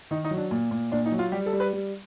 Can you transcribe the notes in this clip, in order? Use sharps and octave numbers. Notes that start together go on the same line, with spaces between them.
D#3 D#4
D#4
F#3
D4
A#2
A#2
A#2 D4
D#4
F#3
F4
G3 G4
A4
G3
B4
G3